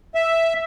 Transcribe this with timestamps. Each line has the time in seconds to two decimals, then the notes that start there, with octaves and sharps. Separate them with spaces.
0.15 E5